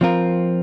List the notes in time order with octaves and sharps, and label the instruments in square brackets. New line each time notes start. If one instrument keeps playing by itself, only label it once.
[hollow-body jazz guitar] F3 C4 F4 A#4